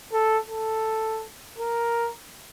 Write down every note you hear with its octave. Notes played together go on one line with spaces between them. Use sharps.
A4
A4
A#4